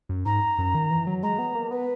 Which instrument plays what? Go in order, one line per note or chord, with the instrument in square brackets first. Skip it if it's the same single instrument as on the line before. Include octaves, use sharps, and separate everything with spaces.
[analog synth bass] F#2
[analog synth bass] G#2 [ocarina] A#5
[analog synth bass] F#2
D#3
E3
F#3
[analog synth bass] G#3 [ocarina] A#5
[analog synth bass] B3
A#3
[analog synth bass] B3 [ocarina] B4